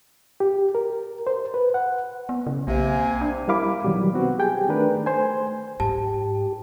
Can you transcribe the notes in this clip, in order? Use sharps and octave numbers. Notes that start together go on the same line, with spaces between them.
G4
A#4
C5
B4
F#5
B3
C#3
B1 C3 A#3 G#5
D4
G3 E4 A#4 F5 B5 D6
B2 D#3 F#3 G3
B3 C4 F#4
G4 G#4 G5 G#5
D#3 A3 D4 A#4 B4
A3 C5 G#5
G#2 G4 A5